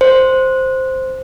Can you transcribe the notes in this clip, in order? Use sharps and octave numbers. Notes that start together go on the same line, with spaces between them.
C5